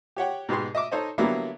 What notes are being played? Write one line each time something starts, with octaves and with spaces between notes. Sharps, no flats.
G4 C#5 F#5 G5
G#2 B2 B3 G4 G#4 C6
D#5 E5 D6
D#4 A4 C5 C#5 D#5
D3 F#3 G3 A#3 B3 E4